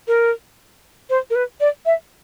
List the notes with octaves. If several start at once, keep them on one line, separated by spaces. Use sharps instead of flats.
A#4
C5
A#4
B4
D5
E5